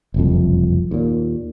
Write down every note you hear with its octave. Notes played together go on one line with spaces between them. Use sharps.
F#1 C2 F2
D#2 A#2